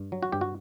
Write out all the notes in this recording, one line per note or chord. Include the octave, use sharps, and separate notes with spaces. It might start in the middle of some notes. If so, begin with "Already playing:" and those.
Already playing: G2
F#3
F#4
G2 G4
F#4